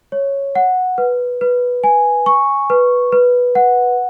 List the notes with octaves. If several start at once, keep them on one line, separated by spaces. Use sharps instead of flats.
C#5
F#5
B4
B4
G#5
C#6
B4
B4
F#5